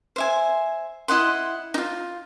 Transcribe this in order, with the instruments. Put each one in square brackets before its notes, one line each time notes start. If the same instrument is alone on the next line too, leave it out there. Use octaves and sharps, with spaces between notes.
[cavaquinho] C5 E5 G#5
E4 D#5 F#5 C6
D#4 F4